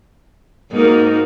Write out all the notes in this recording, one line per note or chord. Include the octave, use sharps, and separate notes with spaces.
G#2 A#3 D#4 F#4 A#4